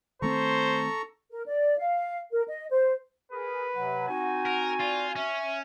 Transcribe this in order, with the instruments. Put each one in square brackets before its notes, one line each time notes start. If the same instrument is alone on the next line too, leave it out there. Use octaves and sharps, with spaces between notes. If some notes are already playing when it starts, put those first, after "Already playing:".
[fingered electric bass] D#3 A3 C4 [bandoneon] A4 A#5 C#6 [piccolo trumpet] C5
[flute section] A#4
D5
F5
A#4
D#5
C5
[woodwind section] G#4 A#4 [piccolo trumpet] B4
[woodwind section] C3 F#3 [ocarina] F#5
[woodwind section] C4 D#4 F#4 [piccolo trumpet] G#5
[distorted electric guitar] A#4
[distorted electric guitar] F4 [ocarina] D5
[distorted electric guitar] C#4 [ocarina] E5